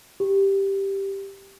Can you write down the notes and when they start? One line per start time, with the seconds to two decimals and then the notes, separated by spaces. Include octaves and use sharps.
0.20 G4